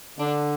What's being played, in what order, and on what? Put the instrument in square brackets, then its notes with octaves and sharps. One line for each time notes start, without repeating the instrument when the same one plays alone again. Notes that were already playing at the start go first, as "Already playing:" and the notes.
[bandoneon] D3 [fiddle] D4